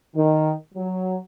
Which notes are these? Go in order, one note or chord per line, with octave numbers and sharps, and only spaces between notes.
D#3
F#3